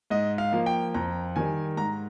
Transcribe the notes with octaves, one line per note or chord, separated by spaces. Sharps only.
G#2 D#5
F5
F3 A#3
G5
F2 A#5
D#3 G3 G#5
G#2 A#5